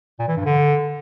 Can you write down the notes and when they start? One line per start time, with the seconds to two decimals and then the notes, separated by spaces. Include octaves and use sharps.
0.19 A#2
0.28 E3
0.37 G2
0.45 D3